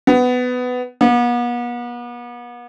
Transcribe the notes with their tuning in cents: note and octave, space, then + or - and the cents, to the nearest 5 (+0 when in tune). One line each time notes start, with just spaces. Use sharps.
B3 +15
B3 -40